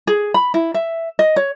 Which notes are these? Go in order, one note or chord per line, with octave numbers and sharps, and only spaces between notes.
G#4
B5
E4
E5
D#5
C#5